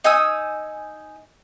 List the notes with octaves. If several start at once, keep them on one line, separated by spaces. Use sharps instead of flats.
D#4 G#5 D#6 E6